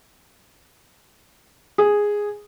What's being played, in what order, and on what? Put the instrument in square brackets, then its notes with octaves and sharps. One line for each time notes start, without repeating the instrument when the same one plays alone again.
[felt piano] G#4